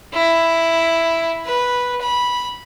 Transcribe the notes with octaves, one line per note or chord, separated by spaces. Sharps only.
E4
B4
B5